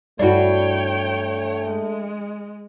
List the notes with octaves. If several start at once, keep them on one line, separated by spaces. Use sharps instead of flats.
G2 A3 D4 E4 F#4 C#5 G5
G#3